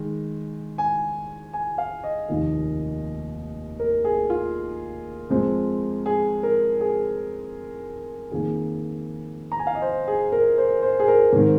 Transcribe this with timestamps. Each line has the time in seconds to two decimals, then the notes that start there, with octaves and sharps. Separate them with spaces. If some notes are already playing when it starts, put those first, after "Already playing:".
Already playing: D#3 G#3
0.78 G#5
1.53 G#5
1.78 F5
2.03 D#5
2.28 F1 D#2 D#3 A#3
3.80 A#4
4.04 G#4
4.30 F4
5.30 F2 F3 G#3 C4
6.06 G#4
6.43 A#4
6.81 G#4
8.31 F2 D#3 A#3 G#4
9.52 A#5
9.59 G#5
9.67 F5
9.75 D#5
9.82 C5
10.08 G#4
10.32 A#4
10.58 C5
10.82 C5
11.00 G#4
11.08 A#4
11.33 G#2 D#3 C4